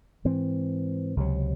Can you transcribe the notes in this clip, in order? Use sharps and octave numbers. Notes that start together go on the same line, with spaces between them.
G#2 E3 C4
C#2 C3 F#3